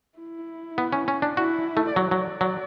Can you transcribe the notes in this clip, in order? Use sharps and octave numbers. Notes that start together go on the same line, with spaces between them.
E4
B3
C#4
C#4
D4
E4 F#4
A3
F#3 D5
F#3
F#3